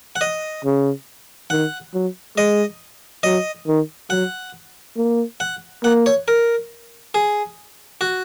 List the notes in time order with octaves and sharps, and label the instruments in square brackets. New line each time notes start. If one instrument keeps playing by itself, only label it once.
[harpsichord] F#5
D#5
[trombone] C#3
[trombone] D#3 [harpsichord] F#5
[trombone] F#3
[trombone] G#3 [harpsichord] D#5
[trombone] F#3 [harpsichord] D#5
[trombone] D#3
[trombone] F#3 [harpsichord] F#5
[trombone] A#3
[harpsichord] F#5
[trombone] A#3 [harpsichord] F#5
[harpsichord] C#5
A#4
G#4
F#4